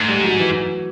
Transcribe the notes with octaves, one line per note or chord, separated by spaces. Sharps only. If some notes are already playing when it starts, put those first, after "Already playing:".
Already playing: G#2 A3
G3
F#3
E3